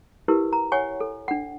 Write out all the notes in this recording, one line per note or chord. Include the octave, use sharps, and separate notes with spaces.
E4 G4 A#4 B4
A#5
C#5 F#5 G#5 C#6
A4
D4 F#5